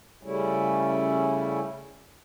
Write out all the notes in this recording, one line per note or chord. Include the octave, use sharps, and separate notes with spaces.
C#3 G3 A3 C#4 E4